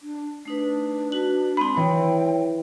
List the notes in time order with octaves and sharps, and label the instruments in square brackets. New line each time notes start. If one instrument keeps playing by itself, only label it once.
[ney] D4
[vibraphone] A3 D#4 B4 [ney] D4
[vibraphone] F#4 B4 [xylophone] F#7
[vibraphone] G#3 C4 D#4 [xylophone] B5 C6
[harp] E3 [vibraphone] C#5 [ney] G5